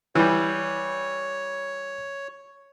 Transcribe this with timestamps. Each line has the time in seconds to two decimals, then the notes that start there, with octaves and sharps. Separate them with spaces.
0.15 E3 G3 C#5